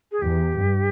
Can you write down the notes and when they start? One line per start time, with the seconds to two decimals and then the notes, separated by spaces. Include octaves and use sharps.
0.11 G#4
0.21 E2 G4
0.59 G2